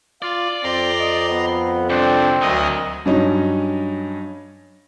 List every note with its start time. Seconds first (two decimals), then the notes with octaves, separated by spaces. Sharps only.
0.22 F4 D5
0.63 F2 C4 A#5 C6
0.99 D#5
1.30 B3
1.90 C2 C4 D4
2.42 D2 F#3 A#4 D#5
3.06 G2 F#3 C#4 D#4